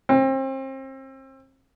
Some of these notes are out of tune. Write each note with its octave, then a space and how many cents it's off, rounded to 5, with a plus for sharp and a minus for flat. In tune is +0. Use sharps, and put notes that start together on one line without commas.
C4 +35